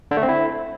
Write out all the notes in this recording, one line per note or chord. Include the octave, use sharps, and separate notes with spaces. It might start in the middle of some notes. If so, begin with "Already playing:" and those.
D3
A3
C4
E4